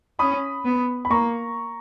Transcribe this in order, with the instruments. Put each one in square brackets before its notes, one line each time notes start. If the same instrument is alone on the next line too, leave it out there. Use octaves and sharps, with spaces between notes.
[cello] C#4 [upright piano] B5 D#6
[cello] B3
[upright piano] B5
[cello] A#3 [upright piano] A#5 C#6